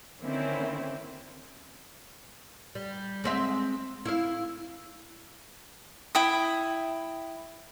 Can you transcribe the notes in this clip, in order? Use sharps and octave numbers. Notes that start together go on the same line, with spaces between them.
D3 D#3 A#3 C4 C#4 E4
G3
G#3 C4 E5
E4 F5
E4 G5 D#6